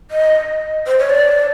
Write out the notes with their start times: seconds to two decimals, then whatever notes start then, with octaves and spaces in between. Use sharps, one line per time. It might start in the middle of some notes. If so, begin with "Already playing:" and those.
0.11 D#5
0.87 C5
0.98 C#5
1.10 D5